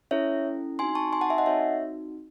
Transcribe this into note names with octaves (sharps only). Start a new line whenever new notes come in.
C#4 E4 A4 C#5 E5
C4 D#4 F#4 G#5 C6
A5 C#6
G#5 C6
F#5 A5
E5 G#5
D#5 F#5
C4 D#4 F#4 A4 C#5 E5